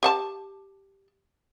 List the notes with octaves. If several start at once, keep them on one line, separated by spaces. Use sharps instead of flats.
G4 F#5 A5